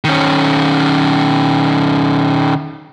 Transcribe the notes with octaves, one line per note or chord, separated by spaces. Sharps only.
D#3 C#4